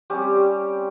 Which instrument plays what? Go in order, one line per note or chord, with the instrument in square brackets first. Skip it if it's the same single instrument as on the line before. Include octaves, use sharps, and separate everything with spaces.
[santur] G3 C4 C#4 G4